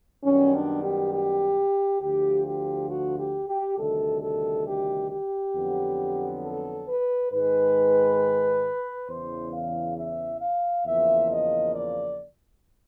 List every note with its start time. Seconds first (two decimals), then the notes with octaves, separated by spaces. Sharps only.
0.24 F#2 D#3 G3 B3 C#4
0.53 D4
0.82 G4
1.12 G4
2.00 D2 D3 F3 G4
2.45 G4
2.89 F#4
3.18 G4
3.48 G4
3.78 D2 C3 D#3 G3 A4
4.21 A4
4.66 G4
5.10 G4
5.54 F2 D3 F#3 B3
6.43 A4
6.87 B4
7.31 G#2 D#3 G#3 B4
9.08 E2 C#3 E3 C5
9.52 F5
9.96 E5
10.41 F5
10.85 E2 C#3 F3 A#3 E5
11.30 D#5
11.74 D5